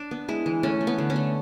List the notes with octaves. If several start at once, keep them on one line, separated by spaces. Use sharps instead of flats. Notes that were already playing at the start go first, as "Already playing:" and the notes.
Already playing: D4
B3
G#3 E4
E3
A3 C#4
A3
B3
D3
C#4
A3